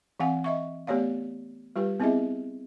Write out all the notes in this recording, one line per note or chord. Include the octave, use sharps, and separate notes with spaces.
E3 C4 F5 F#5 G#5
D#5 E5 C#6
A3 B3 G4 C#5 D5 F5
G3 F4 G4 B4
B3 C4 E4 G#4 D#5 E5